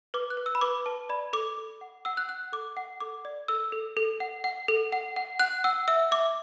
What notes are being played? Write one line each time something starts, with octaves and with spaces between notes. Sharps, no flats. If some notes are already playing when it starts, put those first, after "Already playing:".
B4 D6
F#6
B4
E6
B5
B4 D6
B4 A5
D5 B5
A4 D6
A4
F#5
F#5 E6
F#6
F#5 F#6
A4 D6
F#5
A4 D6
D5
A4 E6
A4
A4
F#5
F#5
A4
F#5
F#5
F#5 F#6
F#5 E6
E5 E6
E5 D6